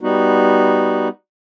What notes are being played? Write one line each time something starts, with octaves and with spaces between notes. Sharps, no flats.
G3 B3 D#4 F#4